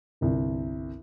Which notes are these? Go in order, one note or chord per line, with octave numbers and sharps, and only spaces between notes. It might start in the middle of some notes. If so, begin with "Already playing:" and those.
G1 C2